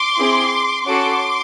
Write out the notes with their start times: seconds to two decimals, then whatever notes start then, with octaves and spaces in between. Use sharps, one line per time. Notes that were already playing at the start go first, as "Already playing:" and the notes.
Already playing: C6 D6
0.17 C4 E4 G#4
0.84 C#4 F#4 A4 C6 D6